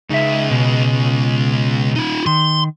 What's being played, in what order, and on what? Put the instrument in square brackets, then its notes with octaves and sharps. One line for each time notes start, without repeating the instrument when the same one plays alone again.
[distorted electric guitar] C#2 [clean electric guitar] D#4 E5
[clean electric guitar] B2
[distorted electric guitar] D#4 F4
[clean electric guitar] D#3 [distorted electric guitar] C6